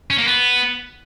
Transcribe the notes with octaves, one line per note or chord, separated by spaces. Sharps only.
C#4
A#3
B3